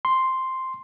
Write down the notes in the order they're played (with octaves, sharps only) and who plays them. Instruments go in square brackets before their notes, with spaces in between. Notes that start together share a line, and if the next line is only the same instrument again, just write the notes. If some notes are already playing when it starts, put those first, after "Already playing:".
[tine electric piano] C6